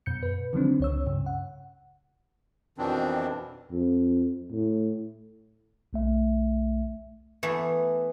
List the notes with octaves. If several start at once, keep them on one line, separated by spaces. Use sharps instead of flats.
F#2 B2 G6 C#7
B4
D3 D#3 F3 F#3 C4 D4
C#2 C#5 E6
G2 C#3
F#5
F2 B2 D#3 E3 C4 D4
F2
A2
B1 A3 E5
E3 A3 B3